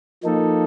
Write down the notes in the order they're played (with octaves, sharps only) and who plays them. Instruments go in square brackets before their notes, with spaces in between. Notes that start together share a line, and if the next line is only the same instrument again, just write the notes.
[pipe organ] F3 A#3 D#4 A4